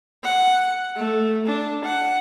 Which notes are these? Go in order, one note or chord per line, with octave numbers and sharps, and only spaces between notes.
F#5
A3
D4
F#5